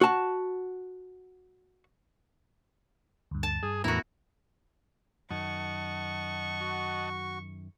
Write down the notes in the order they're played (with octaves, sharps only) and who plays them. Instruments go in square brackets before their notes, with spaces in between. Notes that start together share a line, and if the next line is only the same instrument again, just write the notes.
[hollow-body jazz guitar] F#4 A5
[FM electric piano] D2 G2
[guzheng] A5
[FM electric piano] G2 [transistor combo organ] G#4
[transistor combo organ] E2 A2 A#5 [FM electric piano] B3 A#4 [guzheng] E4 F#4
[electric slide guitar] F#2 D#3 [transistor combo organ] D#5 F#5 A5 [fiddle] C#6
[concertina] F#4